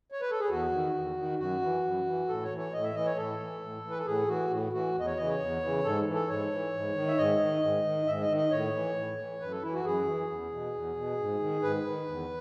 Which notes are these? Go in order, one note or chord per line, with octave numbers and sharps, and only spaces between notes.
C#5
B4
A4
G#4
E2 F#4
D#3
E2
D#3
F#2 F#4
E3
F#2
E3
A2 A4
C#5
E3
C#5
A2 D#5
E5
E3 D#5
C#5
A2 A4
E3
A2
E3
B4
A4
A2 G#4
E3 F#4
A2
E3 F#4
E2 D#5
C#5
C#3 E3 D#5
C#5
E2
C#3 E3
G#2 A4
E3
A4
G#2 C#5
E3
G#2
D#3
E5
G#2 D#5
D#3
G#2
D#3
G#2 E5
D#5
D#3
D#5
A2 C#5
E3
A2
E3
F#2 B4
A4
E3 E4
F#4
F#2 G#4
E3
E2
B2
E2
B2
G#2
D#3
G#2 B4
D#3
E2